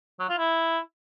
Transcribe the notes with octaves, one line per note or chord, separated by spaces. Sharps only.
F#3
F4
E4